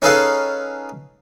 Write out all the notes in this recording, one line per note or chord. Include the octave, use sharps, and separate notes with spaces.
C#4 D#4 G#4 A4 B4 F5